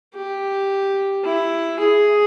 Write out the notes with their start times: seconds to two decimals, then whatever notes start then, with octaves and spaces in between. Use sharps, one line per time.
0.15 G4
1.24 E4
1.79 G#4